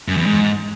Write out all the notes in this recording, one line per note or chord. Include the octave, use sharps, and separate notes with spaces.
F#2
E2
G#2